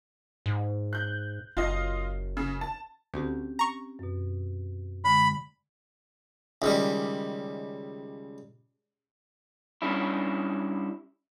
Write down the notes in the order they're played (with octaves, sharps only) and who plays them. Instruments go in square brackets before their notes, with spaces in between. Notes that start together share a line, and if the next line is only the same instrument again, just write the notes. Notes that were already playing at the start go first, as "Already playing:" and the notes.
[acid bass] G#2
[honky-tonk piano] F#6 G6
[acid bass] F#1 [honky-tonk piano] F4 D#5
[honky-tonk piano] C#3
A5
[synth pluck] D2 [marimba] C4 C#4 G4
[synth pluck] A#5 C#6
[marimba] F#2 B2
[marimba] D3 G#3 [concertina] B5
[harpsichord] C#2 D#3 G3
[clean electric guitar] G3 C#4 D4 E4